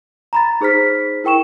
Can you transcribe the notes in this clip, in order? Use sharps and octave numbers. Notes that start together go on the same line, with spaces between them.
A#5 B5 A6
D#4 G#4 C5 F6 B6
E4 A#4 G5 C#6 E7